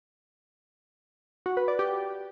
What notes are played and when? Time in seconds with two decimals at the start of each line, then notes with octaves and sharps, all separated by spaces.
1.46 F#4
1.57 B4
1.68 D5
1.79 G4